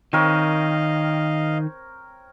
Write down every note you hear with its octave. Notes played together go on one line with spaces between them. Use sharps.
D#3 C4 A#4 C#5 D#5 F5